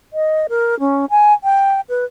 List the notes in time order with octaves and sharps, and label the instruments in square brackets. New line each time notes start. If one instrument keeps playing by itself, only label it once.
[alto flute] D#5
A#4
C#4
G#5
G5
B4